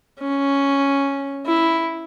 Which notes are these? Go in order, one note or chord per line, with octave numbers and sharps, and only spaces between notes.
C#4
E4